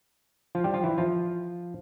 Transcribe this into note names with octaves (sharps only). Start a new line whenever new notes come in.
F3 F4
G3 G4
F3 F4
E3 E4
F3 F4